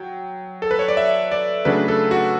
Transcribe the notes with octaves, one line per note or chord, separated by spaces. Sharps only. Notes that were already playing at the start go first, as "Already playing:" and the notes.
Already playing: F#3 G5
A4
B4
C#5
D5
E5
D5
C#3 F#3 A3 D4 B4
A4
F#4